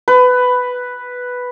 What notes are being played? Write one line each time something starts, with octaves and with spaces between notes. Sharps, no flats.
B4